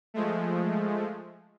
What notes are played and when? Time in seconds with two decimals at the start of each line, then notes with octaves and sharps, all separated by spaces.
0.14 F3 G#3 A3